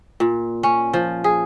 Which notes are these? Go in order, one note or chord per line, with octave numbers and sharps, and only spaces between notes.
A#2
C#4
F3
G#4